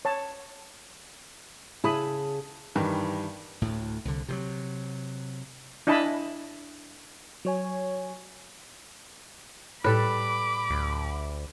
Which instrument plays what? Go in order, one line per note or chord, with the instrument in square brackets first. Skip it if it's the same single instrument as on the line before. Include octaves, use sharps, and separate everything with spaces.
[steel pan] C#5 A5
[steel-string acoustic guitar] C#3 G#4 A5 [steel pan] E4 B5 D#6
[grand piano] G2 D#3 E3
[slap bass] D2 A2
C2 D3
C3 E3 F#3
[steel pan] D4 E4 D#5 G#5 A5 B5
[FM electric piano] F#3 C#5 G#5
[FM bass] A2 [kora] G3 A4 B4 [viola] B5 D6
[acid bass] D2